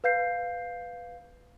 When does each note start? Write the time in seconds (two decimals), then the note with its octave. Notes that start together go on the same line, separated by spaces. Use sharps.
0.04 B4 F5 G6 C7